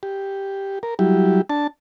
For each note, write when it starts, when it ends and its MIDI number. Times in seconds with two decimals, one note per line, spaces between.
0.03 0.79 67
0.83 0.94 70
0.99 1.41 54
0.99 1.41 55
0.99 1.41 64
0.99 1.41 67
1.50 1.67 62
1.50 1.67 81